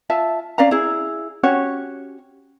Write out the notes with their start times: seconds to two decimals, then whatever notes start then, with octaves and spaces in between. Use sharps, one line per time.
0.10 F4 E5 A5
0.58 C#4 D5 F5 A#5
0.71 E4 G#4
1.43 C#4 F#4 G4 C#5